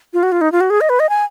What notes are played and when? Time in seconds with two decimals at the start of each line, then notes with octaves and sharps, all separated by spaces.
0.14 F4
0.23 F#4
0.32 F4
0.41 D#4
0.52 F4
0.61 F#4
0.70 G#4
0.81 D#5
0.89 B4
1.00 D#5
1.09 G#5